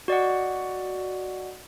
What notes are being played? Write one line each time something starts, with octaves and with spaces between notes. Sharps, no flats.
F#4 D5 D#5 F#5